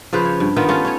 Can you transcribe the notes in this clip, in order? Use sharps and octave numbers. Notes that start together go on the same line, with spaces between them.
C#3 F3 B4 C5
C#5
G2
D#3 B3 D#4 F4
A3 C#4 F4
C#4 C#5